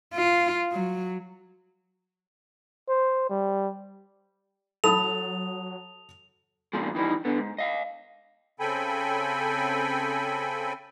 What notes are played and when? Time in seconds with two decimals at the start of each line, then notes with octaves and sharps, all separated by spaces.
0.14 F4
0.72 F#3
2.89 C5
3.30 G3
4.84 F#3 A4 A5 B5 D#6 F7
6.73 A#2 C#3 F3 G#3
6.95 D#3 E3 G3 D#4
7.25 D3 B3
7.38 G#2
7.58 D#5 F5
8.60 C#3 C4 A4 G5 G#5 B5